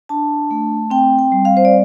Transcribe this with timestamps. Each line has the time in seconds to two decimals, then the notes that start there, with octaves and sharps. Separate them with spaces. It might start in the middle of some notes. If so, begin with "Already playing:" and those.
0.09 D4 A5
0.51 A3
0.90 C4 G5
1.19 G5
1.32 G3
1.45 F5
1.57 C5
1.65 D5